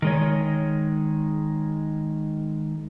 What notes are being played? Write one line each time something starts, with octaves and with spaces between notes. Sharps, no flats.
D#3 G#3 C#5